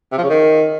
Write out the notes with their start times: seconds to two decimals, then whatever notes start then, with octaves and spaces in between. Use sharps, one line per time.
0.12 C3
0.18 F3
0.24 C#3
0.29 D#3